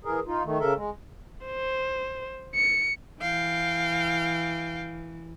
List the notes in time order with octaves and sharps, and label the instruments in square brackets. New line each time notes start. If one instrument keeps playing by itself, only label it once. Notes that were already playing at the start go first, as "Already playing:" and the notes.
[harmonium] E3 G#4 A#4
D#4 F4
D#3 A3
C#3 A4 A#4 E5
G#3
[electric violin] C5
C#7
[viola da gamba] E3 [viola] F5 G5